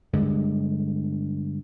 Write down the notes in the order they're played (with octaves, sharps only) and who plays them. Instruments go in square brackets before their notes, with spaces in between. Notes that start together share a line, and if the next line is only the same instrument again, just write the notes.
[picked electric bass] G2 D3 G#3